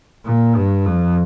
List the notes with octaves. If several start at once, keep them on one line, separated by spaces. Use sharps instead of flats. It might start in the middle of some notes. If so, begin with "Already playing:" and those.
A#2
G2
F2